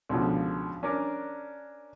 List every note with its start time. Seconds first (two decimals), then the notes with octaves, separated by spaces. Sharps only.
0.09 C#2 B2 D3 F3
0.83 C#4 D4 A#4 D5